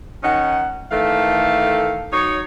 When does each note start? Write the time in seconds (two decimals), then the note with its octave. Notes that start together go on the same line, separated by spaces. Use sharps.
0.24 D#3 C#4 D#4 F#5
0.91 D#3 E3 A3 A4 F5
2.13 F#3 D#4 C#5